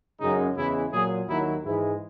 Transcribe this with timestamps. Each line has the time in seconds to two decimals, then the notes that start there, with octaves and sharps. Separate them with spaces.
0.21 F#2 C#3 G#3 D#4
0.56 E2 C#3 E3 G#3 E4
0.92 A#2 F#3 G#4
1.28 D#2 D#3 F#3 E4
1.65 G#2 E3 G#3 E4